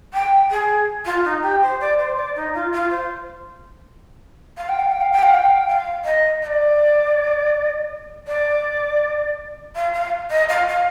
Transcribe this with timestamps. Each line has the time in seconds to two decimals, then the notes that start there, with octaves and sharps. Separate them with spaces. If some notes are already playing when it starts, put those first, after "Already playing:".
0.13 G5
0.50 G#4
1.05 F4
1.24 D#4
1.42 G4
1.62 C5
1.80 D5
1.99 C5
2.16 D5
2.35 D#4
2.54 F4
2.72 F4
2.90 C5
4.57 F5
4.68 G5
4.79 F5
4.91 G5
5.01 F5
5.12 G5
5.23 F5
5.34 G5
5.45 F5
5.57 G5
5.68 F5
6.04 D#5
6.42 D#5
6.46 D5
8.27 D5
9.75 F5
9.93 F5
10.30 D#5
10.48 F5
10.67 F5